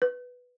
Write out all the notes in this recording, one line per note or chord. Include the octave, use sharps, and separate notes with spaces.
B4